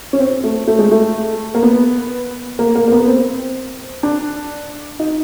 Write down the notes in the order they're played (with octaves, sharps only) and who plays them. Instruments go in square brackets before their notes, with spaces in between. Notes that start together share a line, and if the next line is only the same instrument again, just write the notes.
[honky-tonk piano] C#4
C4
A3
A3
G#3
A3
A#3
B3
A#3
A#3
A#3
B3
C4
D4
D#4